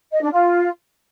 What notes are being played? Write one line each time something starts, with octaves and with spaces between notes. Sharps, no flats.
D#5
D4
F4